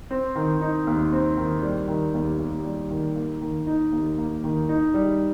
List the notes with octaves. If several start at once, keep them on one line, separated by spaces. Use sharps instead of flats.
C4
D#3
D#4
D#2
C4
D#3
G3
D#3
D#2
D#2
G3
D#3
A#3
D#3
D#4
D#2
A#3
D#3
D#4
G3